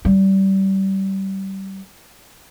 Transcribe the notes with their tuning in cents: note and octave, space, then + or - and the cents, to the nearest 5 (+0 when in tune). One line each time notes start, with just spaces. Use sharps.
G3 -25